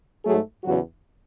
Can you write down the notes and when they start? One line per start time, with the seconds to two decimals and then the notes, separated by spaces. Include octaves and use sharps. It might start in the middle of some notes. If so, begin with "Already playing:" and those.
0.24 G#2 F#3 A3 G#4
0.63 E2 C#3 F#3 F#4